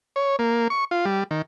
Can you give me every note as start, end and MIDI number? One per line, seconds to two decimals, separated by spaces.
0.16 0.36 73
0.39 0.68 58
0.70 0.85 85
0.91 1.05 65
1.05 1.24 55
1.31 1.42 51